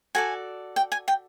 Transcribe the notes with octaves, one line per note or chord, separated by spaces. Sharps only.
F#4 A4 D5 G#5
G5
G#5
G5